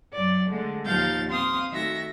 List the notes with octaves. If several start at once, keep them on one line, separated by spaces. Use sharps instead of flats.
F#2 F#3 D5
D3 G#3 A3
D#2 F3 D#4 F5 G6 A6
C4 F5 C6 D#6
D#3 A3 F#4 E5 A#6